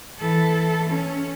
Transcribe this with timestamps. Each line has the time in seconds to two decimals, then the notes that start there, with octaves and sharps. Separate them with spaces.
0.21 E3 A4
0.90 C#4